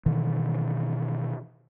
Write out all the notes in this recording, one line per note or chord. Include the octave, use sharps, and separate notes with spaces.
B2 D#3 E3